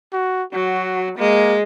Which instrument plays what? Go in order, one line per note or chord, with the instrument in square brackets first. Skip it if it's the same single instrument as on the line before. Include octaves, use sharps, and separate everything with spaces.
[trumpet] F#4
[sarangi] F#3 [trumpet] F#4
[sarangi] G#3 [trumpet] A#3